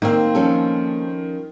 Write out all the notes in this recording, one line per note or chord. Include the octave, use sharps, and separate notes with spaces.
D#3 A#3 C4
F3 C#4 A4